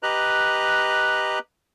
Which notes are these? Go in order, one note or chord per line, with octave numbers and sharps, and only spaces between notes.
G4 B4 D#5 A#5 F#6